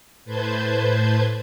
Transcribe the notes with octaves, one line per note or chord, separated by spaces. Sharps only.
A2 B4 C5 A5 G6 G#6